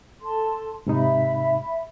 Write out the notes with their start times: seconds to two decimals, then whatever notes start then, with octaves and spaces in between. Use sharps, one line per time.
0.21 A4 A5 C6
0.87 G#2 C3 D#4 E5 B5